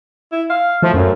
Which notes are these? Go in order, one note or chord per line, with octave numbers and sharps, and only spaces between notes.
E4
F5
F3 A3
F#2